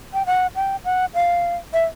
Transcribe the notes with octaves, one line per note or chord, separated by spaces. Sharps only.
G5
F#5
G5
F#5
F5
E5